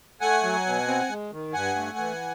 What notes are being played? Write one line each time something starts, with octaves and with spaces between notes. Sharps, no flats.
A3 F#5 G#5
F#3
B2
C4
G#3
D#3
G2 F#5 G#5
A3
E3